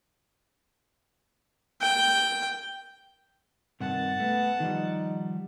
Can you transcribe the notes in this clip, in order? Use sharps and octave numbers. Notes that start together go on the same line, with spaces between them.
G5
G2 C3 D#3 F#5 A5
A3 B3
D#3 F3 G3 D#4